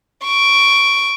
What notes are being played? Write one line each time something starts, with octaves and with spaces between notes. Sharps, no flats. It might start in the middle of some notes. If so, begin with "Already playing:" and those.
C#6 D7